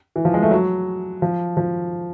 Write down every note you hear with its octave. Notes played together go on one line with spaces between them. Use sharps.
E3
F3
G#3
A3
F#3
F3
F3